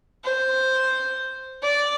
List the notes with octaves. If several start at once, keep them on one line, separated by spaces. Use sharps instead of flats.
C5
D5